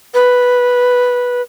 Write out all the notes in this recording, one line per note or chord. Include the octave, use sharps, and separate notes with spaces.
B4